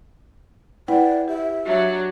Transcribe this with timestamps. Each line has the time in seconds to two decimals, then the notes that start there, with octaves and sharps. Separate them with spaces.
0.88 E4 B4 D5 F#5 G5
1.28 G4 E5
1.65 F#3 D4